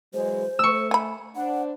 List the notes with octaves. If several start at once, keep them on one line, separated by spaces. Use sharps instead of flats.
E3 F#3 G#3 C5
A3 C#6 E6
G#5 B5
D4 C5 F#5